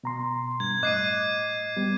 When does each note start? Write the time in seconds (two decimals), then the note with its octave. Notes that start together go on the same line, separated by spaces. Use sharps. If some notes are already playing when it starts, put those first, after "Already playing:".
0.04 B2 A#5 C6
0.60 G2 G#6
0.83 A2 D#5 D6 F#6 C7 D#7
1.77 G3 B3